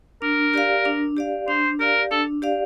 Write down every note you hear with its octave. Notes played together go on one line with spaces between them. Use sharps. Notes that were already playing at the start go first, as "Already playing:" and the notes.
D4 A#4
G4 D5 F5
D4
G4 D5 F5
D4 C5
G4 A#4 D5 F5
D4 A4
G4 D5 F5